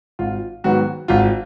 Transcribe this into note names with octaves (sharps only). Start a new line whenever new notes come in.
G#1 F4
G#2 D#3 F#3 B3 F#4
G#1 F4